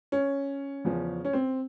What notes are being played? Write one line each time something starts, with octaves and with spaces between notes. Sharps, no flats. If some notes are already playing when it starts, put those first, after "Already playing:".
C#4
E2 C#3 F3
C#4
C4